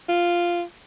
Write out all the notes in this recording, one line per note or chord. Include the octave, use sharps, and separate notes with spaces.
F4